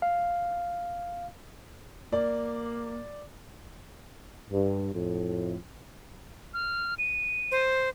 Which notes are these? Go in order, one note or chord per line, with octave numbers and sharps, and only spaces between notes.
F5
A#3 D5
G2
F2 A2
F6
D#7
C5